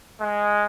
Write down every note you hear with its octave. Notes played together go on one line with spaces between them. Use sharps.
G#3